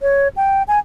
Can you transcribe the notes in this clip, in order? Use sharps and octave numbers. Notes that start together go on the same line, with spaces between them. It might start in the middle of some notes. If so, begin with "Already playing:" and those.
C#5
G5
G#5